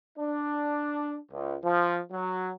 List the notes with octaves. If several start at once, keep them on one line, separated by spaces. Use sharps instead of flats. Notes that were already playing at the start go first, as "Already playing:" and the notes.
D4
C#2
F3
F#3